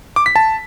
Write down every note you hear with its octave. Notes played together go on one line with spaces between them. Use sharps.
D6
B6
A5